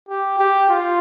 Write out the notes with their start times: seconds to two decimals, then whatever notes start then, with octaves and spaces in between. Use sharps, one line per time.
0.09 G4
0.39 G4
0.70 F4